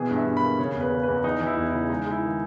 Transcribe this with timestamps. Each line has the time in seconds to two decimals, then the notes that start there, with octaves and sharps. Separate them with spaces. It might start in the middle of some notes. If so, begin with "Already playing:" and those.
Already playing: B2 E3 G#4
0.11 G2
0.16 E5
0.26 G2
0.37 B5
0.42 A#3
0.59 C#3 C#5
0.75 E2
0.81 B4
0.91 C#3
1.03 B4
1.08 E2
1.24 E3 D#4
1.40 E3
1.47 E4
1.57 E2
1.68 E4
1.74 C#3
1.90 G#3 D#4
2.06 G#3 E4
2.22 D#3